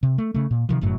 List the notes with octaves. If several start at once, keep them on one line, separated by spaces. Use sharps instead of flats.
C3
A3
C#3 A3
A#2
C3 D#3 F3
G1 F#2 A2 F#3